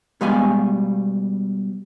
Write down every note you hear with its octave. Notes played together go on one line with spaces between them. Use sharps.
B2 G3 G#3 G4 F5 G#5